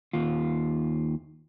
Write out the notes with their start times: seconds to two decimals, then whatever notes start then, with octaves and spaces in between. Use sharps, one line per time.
0.13 D#2 F4